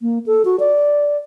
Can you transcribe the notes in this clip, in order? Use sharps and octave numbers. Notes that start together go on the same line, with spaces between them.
A#3
A4
F#4
D5